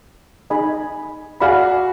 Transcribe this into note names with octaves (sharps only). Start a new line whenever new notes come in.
D#4 G#4 D#5 G#5 B5
F#4 G#4 D5 F5 B5